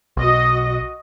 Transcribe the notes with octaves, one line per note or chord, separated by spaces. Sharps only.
B1 F#4 D#5